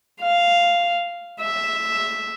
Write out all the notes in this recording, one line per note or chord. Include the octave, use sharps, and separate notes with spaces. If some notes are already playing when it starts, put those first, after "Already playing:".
F5
E5